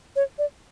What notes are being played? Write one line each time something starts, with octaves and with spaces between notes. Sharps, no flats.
C#5
D5